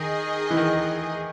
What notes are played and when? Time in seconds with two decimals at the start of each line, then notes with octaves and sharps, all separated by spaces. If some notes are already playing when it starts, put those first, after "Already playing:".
Already playing: D#3 D#4 G#4 D#5 G#5
0.50 E3
0.57 D#3